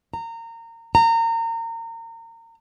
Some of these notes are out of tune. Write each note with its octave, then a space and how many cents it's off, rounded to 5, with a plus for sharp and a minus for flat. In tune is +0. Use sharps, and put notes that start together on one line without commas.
A#5 -25
A#5 -30